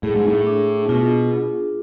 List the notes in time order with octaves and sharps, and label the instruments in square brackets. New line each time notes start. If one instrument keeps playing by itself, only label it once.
[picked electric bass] A2 [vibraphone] G#4
[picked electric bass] G#2
A2
[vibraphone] D4
[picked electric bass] B2 [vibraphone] F4